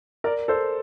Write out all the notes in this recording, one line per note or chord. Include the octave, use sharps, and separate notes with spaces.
A#4 D5
A4 C5